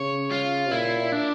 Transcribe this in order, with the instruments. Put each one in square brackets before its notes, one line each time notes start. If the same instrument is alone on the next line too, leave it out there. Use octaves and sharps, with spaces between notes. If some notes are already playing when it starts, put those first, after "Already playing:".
Already playing: [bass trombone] C#3 [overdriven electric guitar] C#5
[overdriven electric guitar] F4
[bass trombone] A#2 [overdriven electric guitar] E4
[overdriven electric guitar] D4